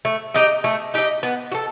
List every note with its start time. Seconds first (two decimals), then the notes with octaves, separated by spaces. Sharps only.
0.05 A3
0.34 D#4 G4 D#5
0.64 A3
0.94 D#4 G4 D#5
1.23 B3
1.52 F#4
1.55 A4